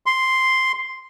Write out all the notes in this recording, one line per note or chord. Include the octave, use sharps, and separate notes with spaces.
C6